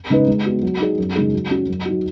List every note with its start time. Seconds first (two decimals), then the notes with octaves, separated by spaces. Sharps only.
0.10 C#3 G#3 D#4 B4
0.28 G#3
0.45 B3 F#4
0.63 F#3
0.80 D#4 G#4
0.98 F#2
1.16 C#3 G#3 D#4 G#4
1.33 F#3
1.51 C#4 F#4
1.68 F#2
1.86 F#3 D#4 F#4